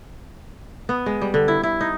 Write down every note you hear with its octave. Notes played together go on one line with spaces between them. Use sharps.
B3
G#3
G3
D3
E4
E4
D#4